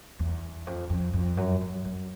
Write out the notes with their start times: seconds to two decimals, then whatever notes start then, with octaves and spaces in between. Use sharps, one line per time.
0.19 E2
0.67 F2
0.90 F2
1.13 F2
1.37 F#2
1.61 F#2
1.85 F#2